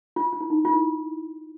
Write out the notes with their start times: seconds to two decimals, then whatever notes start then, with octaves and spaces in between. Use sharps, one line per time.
0.16 F4
0.33 F4
0.41 E4
0.50 D#4
0.65 F4
0.71 E4